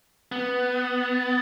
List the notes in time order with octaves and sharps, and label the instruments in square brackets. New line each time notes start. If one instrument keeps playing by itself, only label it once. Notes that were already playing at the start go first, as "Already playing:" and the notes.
[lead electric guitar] B3